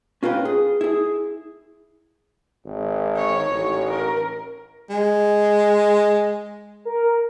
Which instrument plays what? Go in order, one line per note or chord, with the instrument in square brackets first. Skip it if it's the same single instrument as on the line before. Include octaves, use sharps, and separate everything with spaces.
[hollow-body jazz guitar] C#4 F4 A#4 B4 G5
G#4
E4 G#4
[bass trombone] G#1
[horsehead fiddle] D#4 C#5
[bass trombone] A1
[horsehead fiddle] A#4
[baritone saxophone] G#3
[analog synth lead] A#4